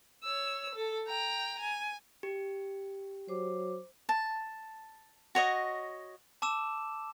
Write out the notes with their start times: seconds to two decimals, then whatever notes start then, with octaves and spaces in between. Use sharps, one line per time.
0.24 C#5 E6
0.75 A4
1.07 G5 A#5
1.60 G#5
2.23 G4
3.28 F#3 C5 D6
4.09 A5
5.35 F#4 C#5 D#5
6.42 A5 D6 E6 E7